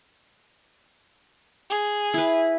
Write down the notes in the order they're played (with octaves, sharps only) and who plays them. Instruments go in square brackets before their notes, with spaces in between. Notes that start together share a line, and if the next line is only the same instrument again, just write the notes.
[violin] G#4
[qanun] E4 B4